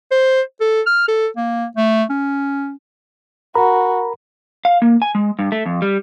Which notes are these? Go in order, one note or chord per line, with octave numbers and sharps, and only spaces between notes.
C5
A4
F6
A4
A#3
A3
C#4
F#4 A#4 A#5 B5
F5
A#3
G#5
G#3
G2
A3
F2
G3